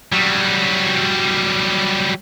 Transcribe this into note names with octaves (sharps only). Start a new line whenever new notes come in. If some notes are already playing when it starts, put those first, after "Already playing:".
F#3 G3